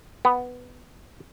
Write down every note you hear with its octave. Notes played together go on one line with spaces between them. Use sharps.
B3